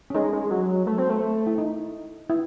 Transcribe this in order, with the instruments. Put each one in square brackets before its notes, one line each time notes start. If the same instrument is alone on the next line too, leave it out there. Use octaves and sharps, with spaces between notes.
[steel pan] C#4
[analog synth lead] G#3 [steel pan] D#4
[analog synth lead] G#3
F#3
A3
C4
A3
[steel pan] E4
D#4
E4